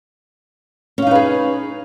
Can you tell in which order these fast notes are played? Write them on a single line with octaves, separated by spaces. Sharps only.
C#4 F5 D#4 B4 G#4